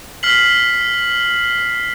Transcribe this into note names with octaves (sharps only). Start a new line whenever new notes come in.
F6 B6 C7 F#7